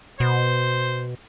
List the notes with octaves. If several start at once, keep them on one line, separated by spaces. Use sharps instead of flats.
B2 C5